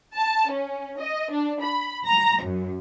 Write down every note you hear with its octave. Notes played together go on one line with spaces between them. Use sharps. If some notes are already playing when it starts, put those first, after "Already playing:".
A5
C#4
D#5
D4
B5
A#5
F#2